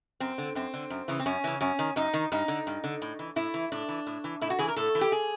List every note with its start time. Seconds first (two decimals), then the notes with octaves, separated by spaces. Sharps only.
0.20 F#2 C4
0.38 D3
0.55 F#2 C4
0.74 D3
0.90 F#2
1.08 C#3 E3
1.20 C4
1.26 F#2 C#4
1.44 C#3 E3
1.61 F#2 C#4
1.79 D#3
1.96 F#2 D#4
2.14 D#3
2.32 G2 D#4
2.48 D3
2.67 G2
2.84 D3
3.02 A2
3.19 E3
3.36 A2 E4
3.54 E3
3.72 A2 D4
3.88 E3
4.07 A2
4.24 E3
4.41 A2 E4
4.50 F#4
4.59 E3 G#4
4.68 A#4
4.76 A2 A4
4.95 E3
5.01 G4
5.12 G#4